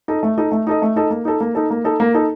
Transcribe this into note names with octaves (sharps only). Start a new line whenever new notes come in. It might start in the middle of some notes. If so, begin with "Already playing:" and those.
D#4 A4 D#5
A3
D#4 A4 D#5
A3
D#4 A4 D#5
A3
D#4 A4 D#5
A#3
D#4 A4
A#3
D#4 A4
A#3
D#4 A4
A#3
D#4 A4